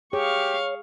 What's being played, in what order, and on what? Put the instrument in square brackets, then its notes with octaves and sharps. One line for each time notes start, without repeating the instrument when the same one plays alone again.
[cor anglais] G4 [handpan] G#4 [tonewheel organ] C#5 [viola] F5 C#6